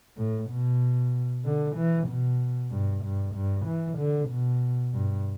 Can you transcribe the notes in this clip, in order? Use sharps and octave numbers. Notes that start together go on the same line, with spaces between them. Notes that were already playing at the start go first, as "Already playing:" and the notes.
A2
B2
D3
E3
B2
G2
G2
G2
E3
D3
B2
G2